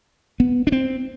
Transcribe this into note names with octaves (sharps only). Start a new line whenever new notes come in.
B3
D4
C4